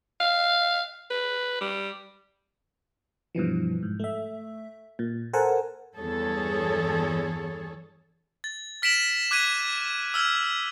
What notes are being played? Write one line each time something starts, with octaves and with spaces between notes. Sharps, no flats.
F5
B4
G3
G2 B2 E3 F3
G#2
A3 E5
A#2
A4 A#4 C5 F#5 G#5 A5
E2 G2 G#4 A4 C#5
A6
F6 B6 D7 E7 F#7
D6 F#6 G#6 B6 D#7
E6 F6 G#6